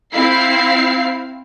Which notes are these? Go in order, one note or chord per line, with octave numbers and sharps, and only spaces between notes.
C4 E4 F5 C7